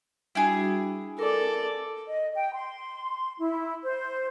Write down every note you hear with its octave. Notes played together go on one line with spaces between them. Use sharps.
G3 D4 E4 F#4 G#4
A4 A#4 D5
D#5
G5
C6
E4
C5